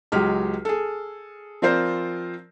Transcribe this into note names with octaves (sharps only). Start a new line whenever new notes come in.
C#2 F#3 G#3 G4 F6
G#4 A4
F3 C4 F4 A#4 C5 D5